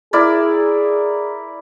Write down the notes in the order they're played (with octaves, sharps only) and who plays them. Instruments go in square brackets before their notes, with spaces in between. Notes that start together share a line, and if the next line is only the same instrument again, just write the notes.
[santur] E4 A#4 D5 [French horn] G#4